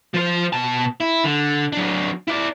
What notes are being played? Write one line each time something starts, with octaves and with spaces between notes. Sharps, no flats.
F3 C5
B2 A5
E4
D3
F#3 D4
E4 D5